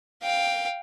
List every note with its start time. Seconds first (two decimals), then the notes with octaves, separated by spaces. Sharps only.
0.23 F5 G5